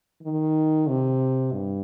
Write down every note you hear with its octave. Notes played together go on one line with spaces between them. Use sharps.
D#3
C3
G2